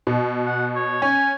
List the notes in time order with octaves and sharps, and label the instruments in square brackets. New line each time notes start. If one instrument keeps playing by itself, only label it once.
[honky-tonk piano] B2
[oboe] F#5
C#5
[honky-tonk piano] C#4 C#5 [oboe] G#5